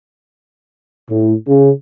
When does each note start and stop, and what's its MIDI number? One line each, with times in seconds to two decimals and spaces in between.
1.09 1.33 45
1.47 1.71 49